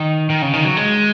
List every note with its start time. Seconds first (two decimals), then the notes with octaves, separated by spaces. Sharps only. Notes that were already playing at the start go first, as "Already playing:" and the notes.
Already playing: D#3
0.30 D#3
0.42 C#3
0.53 D#3
0.65 F#3
0.77 G#3